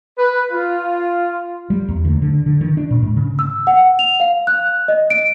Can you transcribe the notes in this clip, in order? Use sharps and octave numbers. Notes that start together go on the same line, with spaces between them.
B4
F4
G3
E2
D2
D3
D3
D#3
D4
A#2
G#2
C#3
E6
F#5
F7
F5
F#6
D#5
D7